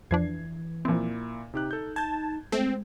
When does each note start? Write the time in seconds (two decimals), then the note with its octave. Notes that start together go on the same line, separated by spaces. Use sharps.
0.11 F2 E3 F3 D4 G#6 C7
0.85 A#2 F3 A#3 C4 E4
1.54 C3 D#4 G4 F#6
1.71 A4 G6
1.96 A5 G6 G#6
2.52 G#3 A3 C4